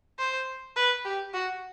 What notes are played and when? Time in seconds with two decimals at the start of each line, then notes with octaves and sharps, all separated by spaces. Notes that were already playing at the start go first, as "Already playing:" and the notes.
0.19 C5
0.77 B4
1.05 G4
1.34 F#4